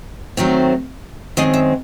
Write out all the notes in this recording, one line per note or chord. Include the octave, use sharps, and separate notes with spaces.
D#3 F#3 A3 C4
F#2 D#3 G#3 C4 D#5
E5